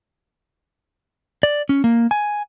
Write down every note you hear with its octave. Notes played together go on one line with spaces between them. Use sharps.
D5
C#4
A#3
G#5